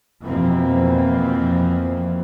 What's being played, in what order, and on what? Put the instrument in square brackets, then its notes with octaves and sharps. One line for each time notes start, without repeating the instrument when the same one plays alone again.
[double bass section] F2 B2 E3 F3 A#3 C4